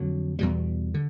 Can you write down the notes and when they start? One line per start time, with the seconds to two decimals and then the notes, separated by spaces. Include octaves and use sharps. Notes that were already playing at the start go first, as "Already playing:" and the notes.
Already playing: F2 D3 F#3
0.39 E2 B2 G3
0.94 D3